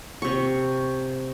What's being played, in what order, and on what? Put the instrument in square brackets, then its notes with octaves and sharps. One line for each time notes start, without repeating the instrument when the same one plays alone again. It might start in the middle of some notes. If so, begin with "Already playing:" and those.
[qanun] C3 C#6